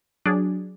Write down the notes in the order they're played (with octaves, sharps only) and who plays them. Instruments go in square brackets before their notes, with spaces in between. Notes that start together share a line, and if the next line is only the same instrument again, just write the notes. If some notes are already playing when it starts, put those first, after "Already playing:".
[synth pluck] F#3 D4 G#4 D5